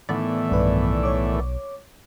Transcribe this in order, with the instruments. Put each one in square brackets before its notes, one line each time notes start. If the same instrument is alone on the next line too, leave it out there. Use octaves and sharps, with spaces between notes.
[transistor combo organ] A2 E3 [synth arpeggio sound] D#3 B3 D5
[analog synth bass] B1 [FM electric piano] G2 B4
[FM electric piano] C#5 D6